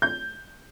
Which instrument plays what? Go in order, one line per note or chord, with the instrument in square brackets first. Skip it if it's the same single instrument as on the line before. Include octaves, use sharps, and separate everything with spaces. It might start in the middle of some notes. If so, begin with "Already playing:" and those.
[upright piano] G6